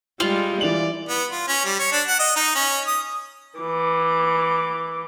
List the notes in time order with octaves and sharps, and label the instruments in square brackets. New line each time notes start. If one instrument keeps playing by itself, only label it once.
[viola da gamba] G3 G#3 [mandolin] F4 [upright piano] F#7
[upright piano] E3 F7 F#7 [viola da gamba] D5
[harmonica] B3
F4
C#4
G3
C#5
D4
F#5
D#5
D#4
C#4
D#6
[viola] E3 D6